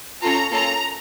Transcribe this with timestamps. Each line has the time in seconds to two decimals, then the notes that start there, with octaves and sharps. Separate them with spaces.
0.22 C#4 F4 A4 A#5
0.52 A#3 C#4 F4 A4 A#5